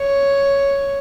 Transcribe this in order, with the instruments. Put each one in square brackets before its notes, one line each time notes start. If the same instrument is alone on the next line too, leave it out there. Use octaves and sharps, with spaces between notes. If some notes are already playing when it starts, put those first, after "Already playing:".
Already playing: [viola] C#5